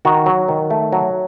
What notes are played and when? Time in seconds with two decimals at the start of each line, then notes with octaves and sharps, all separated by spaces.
0.05 D#3 F#4
0.26 F#3
0.48 D#3
0.70 A3
0.92 F#3